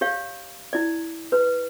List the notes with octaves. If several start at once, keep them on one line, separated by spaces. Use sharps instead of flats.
G4 C#5 F5
E4 D5
B4